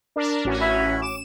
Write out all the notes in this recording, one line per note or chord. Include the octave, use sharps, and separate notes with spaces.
D4 A#4
A1 C#4 F#4
E4 E5 B5
D6 E7